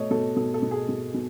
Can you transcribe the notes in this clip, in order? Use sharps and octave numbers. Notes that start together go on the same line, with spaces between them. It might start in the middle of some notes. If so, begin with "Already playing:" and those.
Already playing: B2 A3 C#5 D#5
B2 A4
B2 A4
A4
B2
G#4
B2
B2